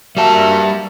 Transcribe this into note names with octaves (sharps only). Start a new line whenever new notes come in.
G3 A#3 F#4 E5 A5